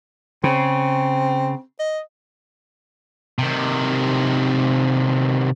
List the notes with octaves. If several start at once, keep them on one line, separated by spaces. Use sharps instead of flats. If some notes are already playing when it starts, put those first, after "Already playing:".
C#3 C4
D#5
C3 D#3